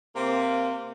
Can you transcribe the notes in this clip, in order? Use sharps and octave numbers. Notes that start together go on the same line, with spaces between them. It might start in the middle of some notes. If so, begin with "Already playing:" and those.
C3 A#3